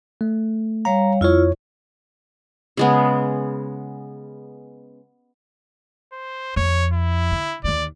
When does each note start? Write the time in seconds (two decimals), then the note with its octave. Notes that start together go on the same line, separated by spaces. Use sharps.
0.21 A3
0.85 G3 C#5 F5 A#5
1.21 F2 E4 F4 C#5
2.77 C#3 G#3 B3
6.12 C5
6.56 F2 C#5
6.93 E4
7.32 D3
7.64 D#2 D#3 D5